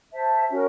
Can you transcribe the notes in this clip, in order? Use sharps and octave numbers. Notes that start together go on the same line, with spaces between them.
C5 E5 A5
C#4 F#4 A#4